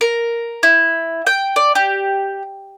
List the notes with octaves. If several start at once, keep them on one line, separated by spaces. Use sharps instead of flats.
A#4
E4
G5
D5
G4